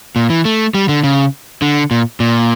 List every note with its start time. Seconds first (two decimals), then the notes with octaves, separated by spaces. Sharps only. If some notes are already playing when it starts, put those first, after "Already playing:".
0.16 A#2
0.30 E3
0.45 A3
0.74 G3
0.89 D3
1.04 C#3
1.62 D3
1.91 A#2
2.20 A#2